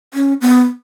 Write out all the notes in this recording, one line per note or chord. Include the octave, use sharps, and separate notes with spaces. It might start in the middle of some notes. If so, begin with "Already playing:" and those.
C#4
B3